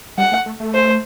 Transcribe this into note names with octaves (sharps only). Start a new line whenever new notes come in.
G3 F#5
A3
A3
A3
C5